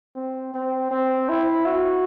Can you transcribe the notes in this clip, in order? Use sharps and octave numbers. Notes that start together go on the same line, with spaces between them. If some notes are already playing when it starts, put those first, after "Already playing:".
C4
C4
C4
E4
F#4